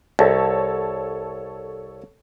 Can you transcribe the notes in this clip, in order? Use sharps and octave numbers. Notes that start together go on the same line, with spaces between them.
C2 A4 C#5 A5